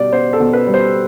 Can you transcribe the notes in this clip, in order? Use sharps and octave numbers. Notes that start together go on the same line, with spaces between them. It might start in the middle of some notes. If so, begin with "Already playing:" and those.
Already playing: B2 G3 D5
B3 C5
A4
B2
B4
G3
C5